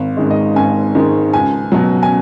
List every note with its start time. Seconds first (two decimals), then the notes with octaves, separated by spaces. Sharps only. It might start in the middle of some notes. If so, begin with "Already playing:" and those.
Already playing: G#1
0.17 G#2 D#3 G#3
0.31 D#5
0.56 G#1 G#5
0.95 G#2 D#3 G#3
1.33 C#2 G#5
1.72 B2 F#3
2.03 G#5